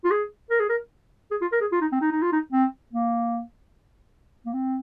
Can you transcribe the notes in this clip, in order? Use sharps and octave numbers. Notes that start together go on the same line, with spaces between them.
F4
G#4
A#4
G#4
A#4
G#4
F4
A#4
G#4
F4
D#4
C4
D#4
D#4
F4
D#4
C4
A#3
A#3
C4